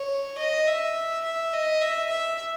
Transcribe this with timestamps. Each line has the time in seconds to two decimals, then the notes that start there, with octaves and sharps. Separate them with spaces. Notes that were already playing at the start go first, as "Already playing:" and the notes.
Already playing: C#5
0.38 D#5
0.68 E5
1.24 E5
1.53 D#5
1.82 E5
2.10 E5